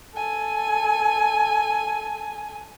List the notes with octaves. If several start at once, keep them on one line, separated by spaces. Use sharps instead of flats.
A4 G#5